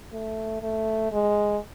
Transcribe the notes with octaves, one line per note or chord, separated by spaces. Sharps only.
A3
A3
G#3